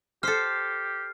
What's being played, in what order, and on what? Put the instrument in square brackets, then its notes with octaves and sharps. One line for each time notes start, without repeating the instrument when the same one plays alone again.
[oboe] G4 [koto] A4 C5 [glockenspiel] F6 C7